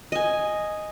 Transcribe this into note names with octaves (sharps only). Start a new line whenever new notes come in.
D#5 G#5